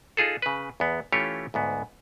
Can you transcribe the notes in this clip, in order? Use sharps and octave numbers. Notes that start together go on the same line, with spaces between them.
D#4 F4 G#4 A4
C#3 B4
E2 B3
E3 A3 C#4 F4 G4 C#5
D2 G#2 B3